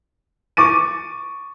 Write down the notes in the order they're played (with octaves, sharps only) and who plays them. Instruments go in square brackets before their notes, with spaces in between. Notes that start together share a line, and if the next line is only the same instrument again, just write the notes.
[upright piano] C#6 D6 A6 D#7